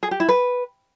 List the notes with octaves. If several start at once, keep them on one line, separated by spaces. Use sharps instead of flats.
G#4
G4
E4
B4